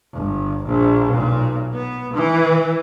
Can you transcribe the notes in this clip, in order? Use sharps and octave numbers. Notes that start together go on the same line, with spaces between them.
G1
A#1
B1 A#2
B3
E3